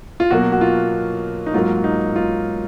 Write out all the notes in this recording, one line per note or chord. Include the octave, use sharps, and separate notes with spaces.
F4
B2 F#3 A#3 F#4
F#4
F4
D#4
G#2 F#3 A#3 F4
D#4
F4